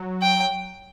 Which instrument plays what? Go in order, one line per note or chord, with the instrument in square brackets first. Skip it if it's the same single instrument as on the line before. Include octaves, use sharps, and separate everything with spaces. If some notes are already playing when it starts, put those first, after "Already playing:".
Already playing: [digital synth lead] F#3
[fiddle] G5